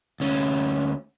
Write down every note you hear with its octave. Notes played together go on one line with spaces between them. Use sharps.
D2 C#4